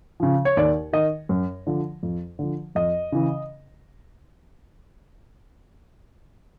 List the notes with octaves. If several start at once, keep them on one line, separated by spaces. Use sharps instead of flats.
C#3 F3
C#5
D#2 D5
D#3 D#5
F#2
D3 F3
F2
D3 F3
F2 D#5
C#3 E3